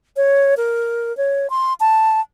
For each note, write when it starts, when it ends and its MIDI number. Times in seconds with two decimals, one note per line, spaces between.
0.17 0.55 73
0.57 1.15 70
1.17 1.50 73
1.50 1.73 84
1.80 2.20 81